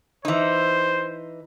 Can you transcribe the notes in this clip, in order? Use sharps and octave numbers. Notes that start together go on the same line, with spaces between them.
E3 D#4 C5